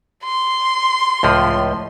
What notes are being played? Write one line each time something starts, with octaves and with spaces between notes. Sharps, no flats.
C6
C#2 A2 F3